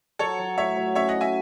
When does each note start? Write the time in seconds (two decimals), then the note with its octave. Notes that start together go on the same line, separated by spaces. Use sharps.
0.19 F#3 A4 C#5
0.39 F#3
0.58 A2 C#5 E5
0.77 F#3
0.95 C#4 C#5 E5
1.09 D#5 F#5
1.15 F#4
1.21 E5 G#5